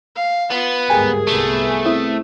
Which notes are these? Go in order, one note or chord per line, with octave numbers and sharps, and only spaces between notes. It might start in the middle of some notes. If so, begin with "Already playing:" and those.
F5
B3 F4
G1 D2 G#2 G4 G#4 A#4 G#5
C2 A3 B3
C4 E4 D#6